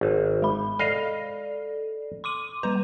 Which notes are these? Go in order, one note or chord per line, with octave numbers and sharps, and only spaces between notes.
G#1
G#3 B5
A4 D5 D#5 F5
C6 D6 D#7
G3 B4 A#5